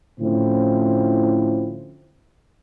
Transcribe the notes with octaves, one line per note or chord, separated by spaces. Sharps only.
A2 D3 F3 C4 C#4 E4